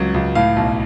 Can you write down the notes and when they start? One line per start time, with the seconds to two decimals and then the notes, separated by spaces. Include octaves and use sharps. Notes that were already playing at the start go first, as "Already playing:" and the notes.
Already playing: C#2 C#3 F#3
0.14 C#2
0.35 A2 F5
0.56 B1